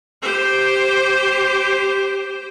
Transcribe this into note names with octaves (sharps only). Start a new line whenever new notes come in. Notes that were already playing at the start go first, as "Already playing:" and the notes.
G4 C5